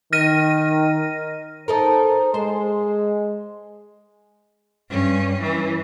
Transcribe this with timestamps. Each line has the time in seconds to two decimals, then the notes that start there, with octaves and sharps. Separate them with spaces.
0.13 D#3 F6 A#6 D#7
1.68 D#4 A4 A#4 C5
2.34 G#3 C5
4.90 G2 C#4
5.41 E3